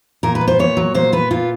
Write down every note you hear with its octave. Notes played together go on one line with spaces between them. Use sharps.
A#2 A#4
B4
B3
C5
A#2 C#5
F#3
A#2 C5
B3 B4
A#2 F4